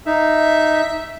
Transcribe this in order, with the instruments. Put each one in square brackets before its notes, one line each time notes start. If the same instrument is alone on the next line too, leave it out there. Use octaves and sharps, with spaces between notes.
[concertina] D#4 [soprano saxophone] E5